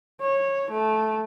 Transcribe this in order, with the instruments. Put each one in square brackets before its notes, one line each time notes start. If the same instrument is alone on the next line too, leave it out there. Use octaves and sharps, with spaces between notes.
[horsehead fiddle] C#5
A3